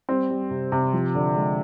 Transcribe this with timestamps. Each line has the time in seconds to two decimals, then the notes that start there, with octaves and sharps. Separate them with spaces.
0.09 G3 C4
0.30 G3
0.51 C3
0.72 C3
0.93 F3
1.15 D3
1.36 G#3